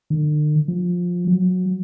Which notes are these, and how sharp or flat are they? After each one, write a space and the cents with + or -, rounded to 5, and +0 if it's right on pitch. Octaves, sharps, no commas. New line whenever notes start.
D3 +45
F3 +15
F#3 -15